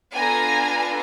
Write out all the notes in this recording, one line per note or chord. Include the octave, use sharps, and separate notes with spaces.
B3 D4 F4 A4 G#5 A#5